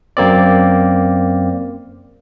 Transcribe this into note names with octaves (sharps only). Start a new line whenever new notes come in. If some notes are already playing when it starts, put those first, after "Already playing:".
F#2 A#3 C4 D5